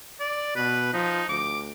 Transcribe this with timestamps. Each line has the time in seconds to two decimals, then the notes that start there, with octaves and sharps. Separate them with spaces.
0.20 D5
0.56 B2 B4
0.93 F3 D#4
1.29 D2 D6